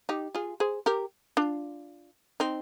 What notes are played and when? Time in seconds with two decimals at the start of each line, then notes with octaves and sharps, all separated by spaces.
0.09 D#4 G4
0.35 F4 G#4
0.60 G#4 C5
0.86 G4 A#4
1.37 D4 F4
2.40 C4 D#4